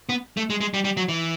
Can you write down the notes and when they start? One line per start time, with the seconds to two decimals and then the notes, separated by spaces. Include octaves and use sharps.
0.09 B3
0.37 A3
0.50 G#3
0.61 G#3
0.74 G3
0.84 G3
0.97 F#3
1.09 E3